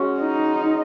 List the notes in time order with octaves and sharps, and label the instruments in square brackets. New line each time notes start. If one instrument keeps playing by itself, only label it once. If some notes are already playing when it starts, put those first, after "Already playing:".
Already playing: [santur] G#3 C#4 F#4
[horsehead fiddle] D#4